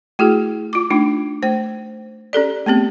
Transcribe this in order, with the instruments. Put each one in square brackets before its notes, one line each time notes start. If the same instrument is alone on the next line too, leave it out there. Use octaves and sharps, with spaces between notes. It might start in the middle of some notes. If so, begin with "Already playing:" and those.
[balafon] A3 E4 F#4 G#4
F4 D6
A3 D4 D#4 F4
A3 C5
C#4 G4 A4 D5
A3 B3 C4 G4